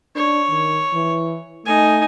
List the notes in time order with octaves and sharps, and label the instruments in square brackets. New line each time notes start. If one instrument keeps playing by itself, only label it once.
[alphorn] D4 [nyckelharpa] C#5
[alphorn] D#3
E3
[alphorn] A3 [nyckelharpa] D#4 G#5